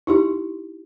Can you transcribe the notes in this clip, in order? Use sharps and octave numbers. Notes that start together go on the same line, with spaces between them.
D#4 E4 G4